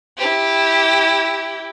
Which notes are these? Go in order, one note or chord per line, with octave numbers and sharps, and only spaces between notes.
E4 G4